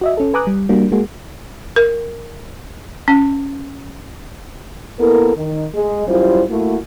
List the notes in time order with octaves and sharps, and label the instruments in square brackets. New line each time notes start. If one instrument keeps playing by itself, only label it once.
[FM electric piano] F#4 D#5 E5
C#4 A4
B4 G#5 A#5 D6 D#6 F#6
G3
G3 A#3 D4 F#4
G#3 A#3 F#4 G#4
[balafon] A#4
C#4
[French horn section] A#3 B3 E4 A4 A#4
D#3
G#3
F#2 G3 E4 F4 C5
A3 A#3 E4 F#4